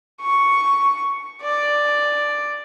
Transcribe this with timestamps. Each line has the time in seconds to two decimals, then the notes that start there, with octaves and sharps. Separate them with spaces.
0.21 C#6
1.42 D5